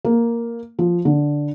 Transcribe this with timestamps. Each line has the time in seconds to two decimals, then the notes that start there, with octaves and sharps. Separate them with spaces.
0.05 A#3
0.79 F3
1.05 D3